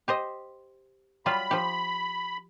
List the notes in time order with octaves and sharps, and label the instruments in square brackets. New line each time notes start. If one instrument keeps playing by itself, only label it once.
[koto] G4 C5 D#5
[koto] F#3 G3 F4 [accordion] B5
[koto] F3 G4